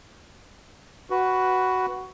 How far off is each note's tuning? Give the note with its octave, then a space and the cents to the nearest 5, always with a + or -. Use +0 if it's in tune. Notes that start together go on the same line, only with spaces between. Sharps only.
F#4 +10 B4 +0